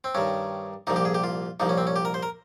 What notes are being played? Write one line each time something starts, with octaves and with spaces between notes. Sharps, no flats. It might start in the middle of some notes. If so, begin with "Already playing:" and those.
C4
G2 D#3 C#4
C2 A#2 F3 D#4
G4
G#4
G4
F4
C2 A#2 F3 D#4
C#4
C4
C#4
G4
A#4
C5
A#4